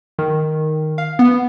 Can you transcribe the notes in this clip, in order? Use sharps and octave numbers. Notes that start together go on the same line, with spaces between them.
D#3
F5
B3